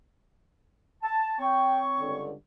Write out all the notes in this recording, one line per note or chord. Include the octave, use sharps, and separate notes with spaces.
A5
C4 C#5 G5 C#6
C#2 G2 D3